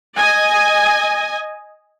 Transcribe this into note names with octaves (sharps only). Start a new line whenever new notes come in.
D#5 G#5